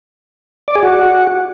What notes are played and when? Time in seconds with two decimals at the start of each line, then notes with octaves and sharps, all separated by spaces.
0.68 D5
0.75 G#4
0.83 F#4